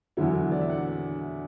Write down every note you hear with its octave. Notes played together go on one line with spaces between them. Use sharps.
E2 D3 F#3 E4
D5
E5
F#5